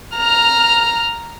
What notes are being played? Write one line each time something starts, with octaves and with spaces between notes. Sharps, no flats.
A#5 F6